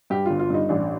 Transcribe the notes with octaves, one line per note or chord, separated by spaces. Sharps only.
G2 G4
G1 F4
F4
G2 D#4
A1 D4